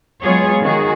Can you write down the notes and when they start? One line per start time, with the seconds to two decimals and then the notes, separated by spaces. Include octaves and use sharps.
0.23 F#3 G#3 B3 F4 G#4 C#5
0.62 D#3 F#4 G#4